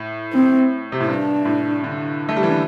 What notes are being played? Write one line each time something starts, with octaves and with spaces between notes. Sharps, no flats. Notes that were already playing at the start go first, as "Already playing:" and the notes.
Already playing: A2
C4
C3
A2
G2 D4
A2
D3
A3
G3
E3
D3